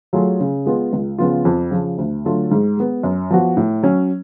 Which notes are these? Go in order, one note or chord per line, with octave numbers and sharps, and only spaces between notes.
F#3 A3 F4 G#4
C#3
G#3 B3 F4
C#2
C#3 F3 B3 F4
F2
C#3 F3
D2
D3 F#3 A3 F4
G#2
G#3 B3
F#2
F3 B3 F#4
A2
F#3 C#4